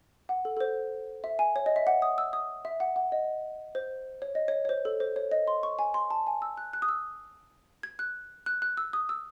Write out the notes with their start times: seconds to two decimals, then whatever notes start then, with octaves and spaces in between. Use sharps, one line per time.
0.29 F#5
0.45 A4
0.57 A4
0.60 C5
1.24 E5
1.39 G#5
1.56 C#5
1.66 D#5
1.76 E5
1.87 F#5
2.02 D#6
2.18 E6
2.33 D#6
2.65 E5
2.80 F#5
2.96 F#5
3.12 D#5
3.75 C5
4.22 C#5
4.35 D#5
4.48 C#5
4.65 C#5
4.69 C5
4.85 A4
5.00 C5
5.16 C#5
5.31 D#5
5.48 C6
5.63 C#6
5.79 G#5
5.94 C6
6.11 A5
6.27 G#5
6.42 E6
6.57 F#6
6.73 F#6
6.82 D#6
6.89 E6
7.83 G#6
7.99 F#6
8.46 F#6
8.62 F#6
8.77 E6
8.93 D#6
9.09 E6